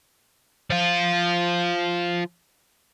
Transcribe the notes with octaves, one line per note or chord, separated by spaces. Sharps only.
F3 F4